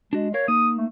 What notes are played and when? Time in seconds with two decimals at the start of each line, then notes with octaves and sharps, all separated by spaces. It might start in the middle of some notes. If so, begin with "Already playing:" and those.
0.13 G#3 D4 F#4
0.34 A#4 C#5 F5
0.48 A#3 D#4 D#6
0.77 A3